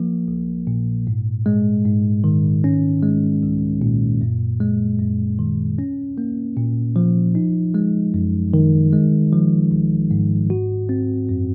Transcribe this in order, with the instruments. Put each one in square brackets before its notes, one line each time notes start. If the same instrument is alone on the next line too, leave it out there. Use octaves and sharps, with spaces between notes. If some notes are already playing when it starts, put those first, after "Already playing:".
Already playing: [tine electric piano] F3 A#3
A#1
A#2
G#2
G#3
G#2
D#3
C#4
G#3
C2
A#2
F#2
G#3
F#2
D#3
C#4
A#3
A#2
F3
D#4
G#3
F#2
D#3
G#3
F3
G#1
G#2
F#4
C4
F#2